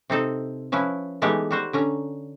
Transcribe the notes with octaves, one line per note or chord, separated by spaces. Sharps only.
C3 C4 D#4 A4
F3 C#4 E4 B4
E3 G#3 A3 B3 D#4 G4
G3 F#4 C5
D3 C#4 A#5